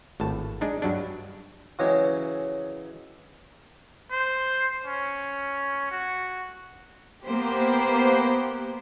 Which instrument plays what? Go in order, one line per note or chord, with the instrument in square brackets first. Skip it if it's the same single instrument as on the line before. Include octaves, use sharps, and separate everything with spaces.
[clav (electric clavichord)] G#1 A2 A5
G#3 D4 D#4
G2 F#3 D4
[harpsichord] C#3 E3 F#3 G#3 C#4 G4
[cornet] C5
C#4
F#4
[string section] A#3 B3 G4 C5